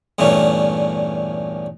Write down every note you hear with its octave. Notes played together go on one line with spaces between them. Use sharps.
E2 G2 A#2 A3 C#4